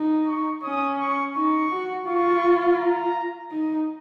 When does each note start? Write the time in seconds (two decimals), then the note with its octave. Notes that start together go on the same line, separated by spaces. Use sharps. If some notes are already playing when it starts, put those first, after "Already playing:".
Already playing: D#4
0.27 C#6
0.63 C#4 D#6
0.99 C#6
1.35 D#4 C#6
1.71 F#4
2.07 F4 C#6
2.78 A#5
3.51 D#4